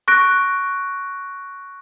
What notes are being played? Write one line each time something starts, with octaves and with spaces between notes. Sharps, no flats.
C#6 F#6 A#6 D7